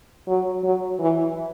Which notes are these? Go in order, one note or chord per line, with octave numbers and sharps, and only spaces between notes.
F#3
F#3
E3